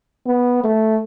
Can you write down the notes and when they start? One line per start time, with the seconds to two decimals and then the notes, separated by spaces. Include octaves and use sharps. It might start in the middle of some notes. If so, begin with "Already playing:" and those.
0.27 B3
0.64 A3